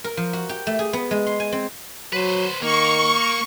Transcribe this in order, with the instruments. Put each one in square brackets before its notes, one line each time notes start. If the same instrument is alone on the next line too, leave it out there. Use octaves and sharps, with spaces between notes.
[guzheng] A#4
F3
F#4
G4
A3
G#4
B3
G#3
C6
G#5
C4
[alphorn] F#3 [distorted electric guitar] B4 C5
[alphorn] D#3 [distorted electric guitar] A#3 [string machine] C#6